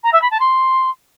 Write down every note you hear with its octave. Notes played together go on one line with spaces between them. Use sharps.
A#5
E5
B5
A5
C6